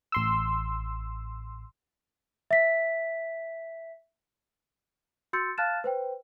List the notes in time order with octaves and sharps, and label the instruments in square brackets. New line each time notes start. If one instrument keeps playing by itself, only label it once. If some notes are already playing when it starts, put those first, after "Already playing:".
[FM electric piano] A1 C6 E6
[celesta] E5 B6
F#4 C6 E6 G6 A6 C#7
F5 A5 F6 F#6 A6 E7
B4 C5 G5